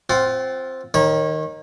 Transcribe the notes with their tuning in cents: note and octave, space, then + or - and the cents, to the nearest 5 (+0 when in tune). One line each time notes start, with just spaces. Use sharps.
C4 +5 F4 +5 F#5 +40
D#3 +0 C#5 -30 B5 -45